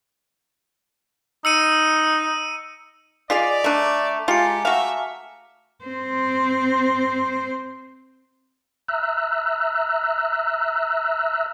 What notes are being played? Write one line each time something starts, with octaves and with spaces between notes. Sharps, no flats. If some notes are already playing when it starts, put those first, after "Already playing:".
D#4 E6 C#7 D#7
F4 G#4 D5 D#5 B6 F7
A3 D4 A5 A#5 D6
G#3 F4 G4 G#5 A#5 C#7
A3 F#4 E5 F5
C4 C5
E5 A#5 E6 F#6